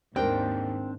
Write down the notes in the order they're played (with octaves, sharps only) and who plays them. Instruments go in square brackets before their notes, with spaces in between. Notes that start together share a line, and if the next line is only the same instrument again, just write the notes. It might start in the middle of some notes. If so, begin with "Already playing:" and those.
[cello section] D#2 G#2 [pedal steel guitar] C4 D4 [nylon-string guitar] A#4 C5 G5